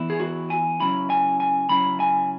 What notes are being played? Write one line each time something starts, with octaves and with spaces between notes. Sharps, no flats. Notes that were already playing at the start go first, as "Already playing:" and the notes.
Already playing: E3 B3 E4
G#4
F#4
G#5
C#3 F#3 C#4 E4 B5
G#5
G#5
C#3 F#3 C#4 E4 B5
G#5